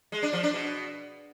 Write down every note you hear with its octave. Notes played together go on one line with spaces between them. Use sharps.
G#3
D4
F3
D4
B2